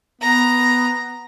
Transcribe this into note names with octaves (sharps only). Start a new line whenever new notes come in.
B3 A#5